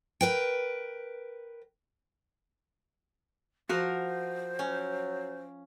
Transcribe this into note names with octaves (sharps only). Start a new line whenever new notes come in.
A#4 B4 G5
F3 F#4 A#4 C5
F#3 C#4